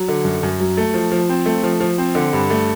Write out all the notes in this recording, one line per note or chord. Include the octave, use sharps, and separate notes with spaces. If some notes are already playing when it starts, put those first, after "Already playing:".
Already playing: F#3
D3
F#2
F#2
F#3
A3
F3
F3
C4
A3
F3
F3
C4
D3
G2
A3